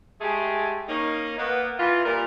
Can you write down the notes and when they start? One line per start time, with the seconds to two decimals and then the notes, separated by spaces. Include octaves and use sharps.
0.21 G#3 A3 G4 G#4
0.89 A#3 C#4 D#4
1.39 A#3 B3
1.80 E3 F4
2.05 A#2 G3 A#4